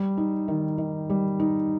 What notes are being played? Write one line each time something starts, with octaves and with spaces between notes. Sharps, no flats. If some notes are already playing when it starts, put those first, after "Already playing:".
Already playing: G3
D#4
D#3
D#3
G3
D#4